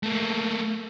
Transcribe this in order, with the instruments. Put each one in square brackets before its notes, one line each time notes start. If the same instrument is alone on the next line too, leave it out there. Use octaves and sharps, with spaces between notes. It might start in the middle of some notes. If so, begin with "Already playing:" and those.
[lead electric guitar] A3 A#3